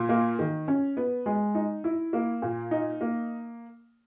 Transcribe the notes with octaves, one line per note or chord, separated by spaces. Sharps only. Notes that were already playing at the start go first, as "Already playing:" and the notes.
Already playing: A#2
A#3
D#3
C#4
B3
G#3
D#4
E4
A#3
A#2
D#4
A#3